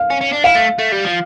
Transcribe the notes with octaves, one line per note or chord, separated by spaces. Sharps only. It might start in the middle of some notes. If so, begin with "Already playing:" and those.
Already playing: F5
C#4
C#4
D4
E4 F5
A3
A3
G3
F3